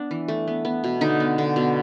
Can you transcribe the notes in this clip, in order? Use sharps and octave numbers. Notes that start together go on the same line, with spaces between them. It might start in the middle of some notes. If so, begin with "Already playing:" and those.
Already playing: B3 D4
E3
A3
B3
B3
B2
D3 D#4
B3
D3
B2